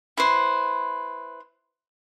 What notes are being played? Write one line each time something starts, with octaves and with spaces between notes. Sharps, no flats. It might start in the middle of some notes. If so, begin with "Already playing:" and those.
E4 B4 C5